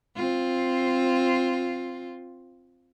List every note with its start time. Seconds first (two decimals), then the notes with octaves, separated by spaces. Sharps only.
0.16 C4 F4